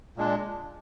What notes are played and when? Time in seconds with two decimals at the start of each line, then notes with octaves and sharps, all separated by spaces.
0.17 A#2 G#3 D4